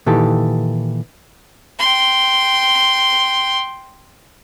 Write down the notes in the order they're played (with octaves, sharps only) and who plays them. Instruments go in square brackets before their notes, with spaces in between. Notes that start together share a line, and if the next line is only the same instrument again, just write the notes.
[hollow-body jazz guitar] A#2 D#3 E3 G4 A4
[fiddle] G5 C6